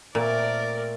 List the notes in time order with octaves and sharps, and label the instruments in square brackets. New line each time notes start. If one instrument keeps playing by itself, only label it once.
[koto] A#2 [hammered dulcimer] A3 C4 [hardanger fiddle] A#4 D5